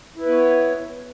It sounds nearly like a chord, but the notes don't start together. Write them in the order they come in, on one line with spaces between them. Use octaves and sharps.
E4 B4 B3 C#5